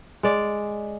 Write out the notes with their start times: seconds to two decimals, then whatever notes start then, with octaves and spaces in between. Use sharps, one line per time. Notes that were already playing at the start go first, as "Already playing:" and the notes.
0.23 G#3 D5